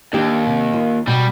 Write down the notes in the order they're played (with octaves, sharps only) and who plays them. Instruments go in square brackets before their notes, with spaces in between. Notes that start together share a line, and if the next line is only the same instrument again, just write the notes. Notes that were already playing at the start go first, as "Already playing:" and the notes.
[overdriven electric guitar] D#2 [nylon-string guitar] D4 G4
[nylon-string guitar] C3
F4
[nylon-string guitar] B2 [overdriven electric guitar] G3